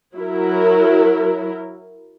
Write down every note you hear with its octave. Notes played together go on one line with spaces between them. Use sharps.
F#3 E4 A#4